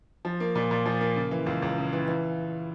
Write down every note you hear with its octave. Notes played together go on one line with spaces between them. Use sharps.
F3
A#3
A#2
A#2
F3
A#3
C#3
E3
C#2
C#2
C#3
E3
E3